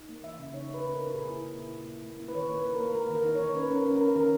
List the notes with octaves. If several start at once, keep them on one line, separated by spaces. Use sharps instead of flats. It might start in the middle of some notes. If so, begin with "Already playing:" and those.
Already playing: D#4
A#3
E3 E5
C#3
D#4 C#5
D#4
B4
C#3
A#4
D#4
A#2 G#4
E4
A#2
E4
A#2
E4
A#3
E4
B4
D#3 C#5
A#3 B4
A#3
A#4
A#3
A#3 A#4
D#3
A#4
D#4
C#5
D#3
C#4 B4
C#4
A#4
C#4
A#4
C#4
D#3 A#4